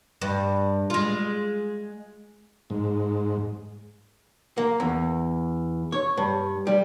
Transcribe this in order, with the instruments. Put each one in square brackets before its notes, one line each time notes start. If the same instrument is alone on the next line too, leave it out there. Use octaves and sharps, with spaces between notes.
[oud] G2
G#3 F4
[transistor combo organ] G#2
[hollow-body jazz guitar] A#3
E2
C#5
G2
G3